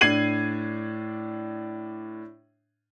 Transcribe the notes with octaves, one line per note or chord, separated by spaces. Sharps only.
A2 D4 G#6 C7 D#7 F#7